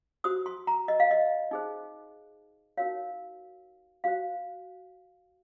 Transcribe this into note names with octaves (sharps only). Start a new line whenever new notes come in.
F#4 C5 D#6
C6
A#5
D#5
F5
D#5
D#4 G#4 C5
D#4 F#4 A#4 C#5 F5
F#4 C5 F5